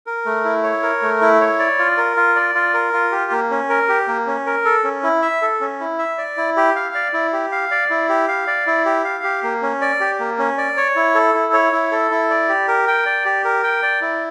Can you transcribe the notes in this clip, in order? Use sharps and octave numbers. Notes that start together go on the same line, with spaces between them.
A#4
A3
E4
C#5
A#4
A3
E4
C#5
D5
F4
A#4
F4
D5
F4
A#4
F4
G4
A#3
C#4
A#4
G4
A#3
C#4
A#4
A4
C#4
E4
E5
A4
C#4
E4
E5
D5
E4
G4
F5
D5
E4
G4
F5
D5
E4
G4
F5
D5
E4
G4
F5
G4
A#3
C#4
D5
G4
A#3
C#4
D5
C#5
E4
A4
E4
C#5
E4
A4
E4
D5
G4
A#4
G5
D5
G4
A#4
G5
D5
E4